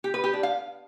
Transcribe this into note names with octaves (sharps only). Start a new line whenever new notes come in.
G4
B4
G4
D4
F5